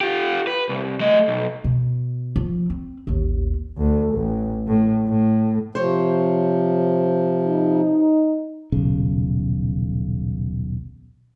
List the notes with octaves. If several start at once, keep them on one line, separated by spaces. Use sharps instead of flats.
F4 G4
B4
C2
A3 D#5
B1
B2
F3
C4
A1 D#2
D2
A1
A2
A2
C3 F3 C5 C#5
D#4
D#1 B1 C#3